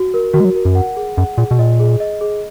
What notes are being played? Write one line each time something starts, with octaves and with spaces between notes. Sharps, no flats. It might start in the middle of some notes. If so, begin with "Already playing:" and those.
Already playing: F#4
A#4
D#3 F#4
G#3
F#3
A#4
F#2
F#5
G#4
F#2 F#5
A#2 G#4
B2
A#2 D#5
G#4
D#5
G#4